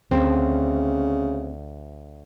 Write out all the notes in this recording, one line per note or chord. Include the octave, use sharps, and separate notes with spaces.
D2 C#3 C4